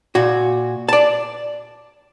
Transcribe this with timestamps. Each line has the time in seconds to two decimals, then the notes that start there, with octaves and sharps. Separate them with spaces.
0.15 A#2 F#4
0.89 D5 A5